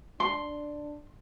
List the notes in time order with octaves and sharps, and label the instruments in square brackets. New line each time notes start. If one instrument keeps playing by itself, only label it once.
[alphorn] D4 [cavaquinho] C6